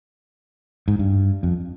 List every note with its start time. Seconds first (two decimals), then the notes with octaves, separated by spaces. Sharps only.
0.88 G#2
0.99 G2
1.43 F2